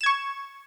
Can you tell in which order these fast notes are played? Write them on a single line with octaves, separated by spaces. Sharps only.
E7 G#6 C#6